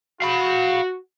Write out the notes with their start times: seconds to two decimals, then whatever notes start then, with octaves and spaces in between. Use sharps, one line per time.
0.22 F#4 F5 B5